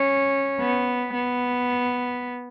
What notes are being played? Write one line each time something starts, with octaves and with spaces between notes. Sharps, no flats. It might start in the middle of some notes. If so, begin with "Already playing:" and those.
Already playing: C#4
B3
B3